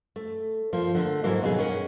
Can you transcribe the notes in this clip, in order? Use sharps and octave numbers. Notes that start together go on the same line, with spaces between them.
A3
F3 A#3
D3 A3 A#3
G#2 E3 F#3 A#3
D#2 B2 D#3 F#3 G#4
C#4 A#4 F#5